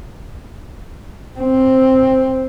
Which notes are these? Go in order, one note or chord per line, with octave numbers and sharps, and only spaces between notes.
C4